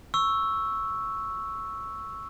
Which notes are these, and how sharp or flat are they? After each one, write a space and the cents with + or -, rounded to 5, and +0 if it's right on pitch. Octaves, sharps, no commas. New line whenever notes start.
C#6 +0 E6 +0